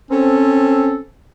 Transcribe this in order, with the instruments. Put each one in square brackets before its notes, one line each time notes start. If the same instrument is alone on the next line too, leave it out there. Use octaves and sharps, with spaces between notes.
[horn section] C4 A4 [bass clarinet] C#4